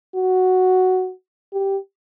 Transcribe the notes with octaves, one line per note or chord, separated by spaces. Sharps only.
F#4
G4